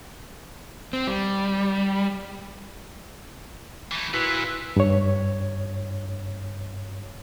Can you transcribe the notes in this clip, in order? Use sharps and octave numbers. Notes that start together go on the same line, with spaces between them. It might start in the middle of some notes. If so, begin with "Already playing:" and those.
C4
G3
E3 A3
A#2 E4 F#4 B4
G2 C#5